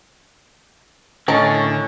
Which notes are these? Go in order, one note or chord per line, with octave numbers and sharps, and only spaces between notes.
A2 D3 D#3 C#4 A5 A#5